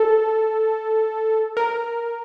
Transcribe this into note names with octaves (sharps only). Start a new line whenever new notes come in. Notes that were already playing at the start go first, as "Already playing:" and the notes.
Already playing: A4
A#4